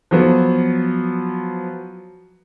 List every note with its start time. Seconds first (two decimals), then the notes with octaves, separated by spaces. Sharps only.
0.11 F3 F#3 B3